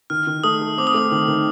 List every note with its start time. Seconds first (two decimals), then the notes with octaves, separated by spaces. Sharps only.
0.10 D#3 F6
0.27 D#3
0.44 A3 D#6
0.62 A3
0.78 C4 D6
0.87 D#6
0.94 A3 D6
1.12 D#3
1.28 D#3